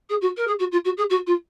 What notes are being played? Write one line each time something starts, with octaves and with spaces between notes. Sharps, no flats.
G#4
F#4
A#4
G#4
F#4
F4
F#4
G#4
F#4
F4